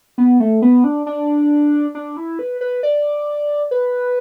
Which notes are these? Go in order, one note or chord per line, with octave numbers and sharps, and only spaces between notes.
B3
A3
B3
D4
D4
D4
E4
B4
B4
D5
B4